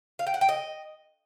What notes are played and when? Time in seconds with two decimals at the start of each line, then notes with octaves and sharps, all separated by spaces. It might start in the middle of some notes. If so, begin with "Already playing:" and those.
0.19 F5
0.27 G5
0.34 F#5
0.41 G5
0.49 D#5